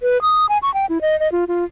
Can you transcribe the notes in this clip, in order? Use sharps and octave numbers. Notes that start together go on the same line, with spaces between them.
B4
D#6
G#5
C#6
G5
E4
D#5
D#5
F4
F4